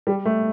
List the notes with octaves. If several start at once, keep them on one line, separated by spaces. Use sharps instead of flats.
G3
A3